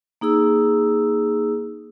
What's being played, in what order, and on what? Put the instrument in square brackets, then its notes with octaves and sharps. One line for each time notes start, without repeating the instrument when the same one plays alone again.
[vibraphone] A#3 D#4 G#4 E6